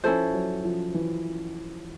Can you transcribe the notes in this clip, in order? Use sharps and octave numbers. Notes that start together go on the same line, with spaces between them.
F3 C#4 E4 A4 C5
F#3
F3
E3